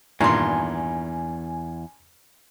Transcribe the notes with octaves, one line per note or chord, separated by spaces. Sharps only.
E2 G2 A#2 D#3 G#5 A#5 C6